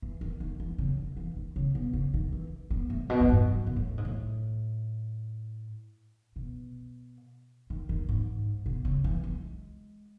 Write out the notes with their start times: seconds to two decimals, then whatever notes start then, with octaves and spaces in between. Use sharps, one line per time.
0.02 E3
0.21 D#3
0.40 D#3
0.60 E3
0.78 C#3
0.97 D#3
1.17 E3
1.36 D#3
1.56 C#3
1.75 B2
1.93 C#3
2.14 D#3
2.32 E3
2.70 B3
2.90 A3
3.04 A2
3.10 B2
3.20 F#2
3.28 G#2
3.48 F#2
3.67 B2
3.76 A2
3.98 G#2
4.05 A2
6.36 B2
7.70 D#3
7.89 D#3
8.09 G#2
8.66 B2
8.85 C#3
9.04 E3
9.23 G#3